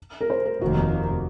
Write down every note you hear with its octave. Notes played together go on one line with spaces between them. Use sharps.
A#4
C5
A#4
F1 D#2 D#3 A#3 F#4